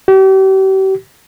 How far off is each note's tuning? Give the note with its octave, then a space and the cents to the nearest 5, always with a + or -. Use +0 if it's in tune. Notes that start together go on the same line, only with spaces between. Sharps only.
G4 -40